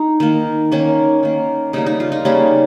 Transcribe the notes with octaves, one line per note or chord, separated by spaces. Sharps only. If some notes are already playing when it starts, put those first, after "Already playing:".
Already playing: D#4
D#3 A#3
D#3 A#3 C#4
D#3 A#3
C#3 G3 A#3 D#4
D#4
F4
D#4
C#3 G3 A#3 C#4